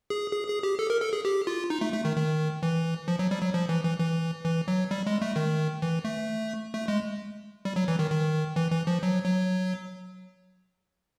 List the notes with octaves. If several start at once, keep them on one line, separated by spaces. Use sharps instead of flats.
G#4
G#4
G#4
G4
A4
A#4
A4
G#4
G4
F4
D#4
A3
A3
D#3
D#3
E3
F3
F#3
G3
F#3
F3
E3
E3
E3
E3
F#3
G3
G#3
A3
D#3
E3
A3
A3
G#3
G3
F#3
E3
D#3
D#3
E3
E3
F3
F#3
F#3